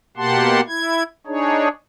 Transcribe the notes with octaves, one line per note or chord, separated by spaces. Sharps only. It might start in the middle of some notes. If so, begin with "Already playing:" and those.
B2 A#3 G4 F#5 A5 C6
E4 G#6
D4 D#4 G#4 C#5